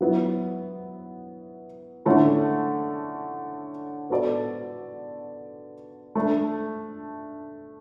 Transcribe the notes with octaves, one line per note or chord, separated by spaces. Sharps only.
F#3 B3 E4
D3 A3 C#4 E4 A4
B3 F#4 A4 D5
A3 D4 A4